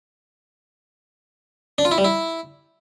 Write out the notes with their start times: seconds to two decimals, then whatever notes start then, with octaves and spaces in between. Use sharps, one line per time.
1.78 D4
1.85 F4
1.91 E4
1.98 G3
2.04 E4